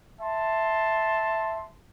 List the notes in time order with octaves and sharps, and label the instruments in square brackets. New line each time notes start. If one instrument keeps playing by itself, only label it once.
[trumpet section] E5 A5 C6